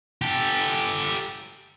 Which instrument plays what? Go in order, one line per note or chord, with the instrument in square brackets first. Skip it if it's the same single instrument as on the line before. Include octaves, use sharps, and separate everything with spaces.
[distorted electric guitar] G4 A4